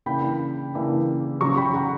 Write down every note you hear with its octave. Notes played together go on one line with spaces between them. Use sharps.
C#3 E3 A#3 D4 G5 B5
C#3 E3 A#3 D4
C#3 F#3 C#4 A#5 C#6
G5 B5
F#5 A#5